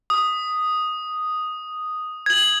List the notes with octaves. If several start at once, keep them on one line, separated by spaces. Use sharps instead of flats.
D#6
G#6 F#7